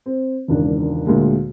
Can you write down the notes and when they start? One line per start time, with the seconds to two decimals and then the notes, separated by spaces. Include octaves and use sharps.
0.06 C4
0.48 E1 C#2 D#3 D4
1.06 D2 A#2 G#3 A#3